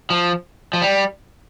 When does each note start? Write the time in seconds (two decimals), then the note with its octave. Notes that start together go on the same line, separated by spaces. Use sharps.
0.10 F3
0.73 F3
0.82 G3